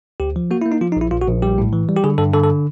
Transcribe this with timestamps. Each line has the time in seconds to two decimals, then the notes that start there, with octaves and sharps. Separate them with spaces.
0.20 D2 G4
0.36 F3
0.51 A#3 F#4
0.62 A#3 E4
0.72 D#4
0.81 F3 F4
0.92 D#4
0.96 A#1 E4
1.11 A#1 F4
1.22 F#4
1.27 A#1
1.42 G3 G4
1.58 A2
1.73 E3
1.89 G3
1.97 G4
2.04 D3 G#4
2.18 G2 A4
2.33 D3 A4
2.43 A4